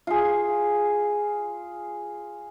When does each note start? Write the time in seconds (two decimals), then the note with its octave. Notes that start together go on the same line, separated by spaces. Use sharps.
0.07 F4 G#4